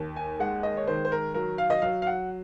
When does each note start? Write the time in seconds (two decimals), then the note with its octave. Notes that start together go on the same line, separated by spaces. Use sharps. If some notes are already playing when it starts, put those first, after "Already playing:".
Already playing: D#2
0.16 G#5
0.40 G#3 F#5
0.63 D#5
0.77 C#5
0.87 D#3 C5
1.05 C5
1.12 A#4
1.34 F#3 A#4
1.58 F5
1.70 D#5
1.82 F#3 F5
2.02 F5
2.07 F#5